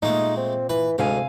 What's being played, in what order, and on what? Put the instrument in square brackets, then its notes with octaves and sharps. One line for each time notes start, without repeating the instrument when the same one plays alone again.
[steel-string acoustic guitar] A#2 [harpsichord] G#3 A3 [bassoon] D#4
[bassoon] C4
[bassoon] E3 [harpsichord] B4
[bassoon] D2 [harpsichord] G#2 [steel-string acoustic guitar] C3 F5 G#5